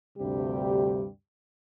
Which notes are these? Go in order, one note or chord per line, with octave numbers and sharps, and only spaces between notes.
D2 G2 C3 G3 G4